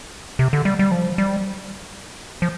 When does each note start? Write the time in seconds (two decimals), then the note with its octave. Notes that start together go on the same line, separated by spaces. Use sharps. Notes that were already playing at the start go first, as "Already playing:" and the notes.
0.39 C3
0.53 D3
0.65 G3
0.79 G3
0.91 F3
1.18 G3
2.42 F3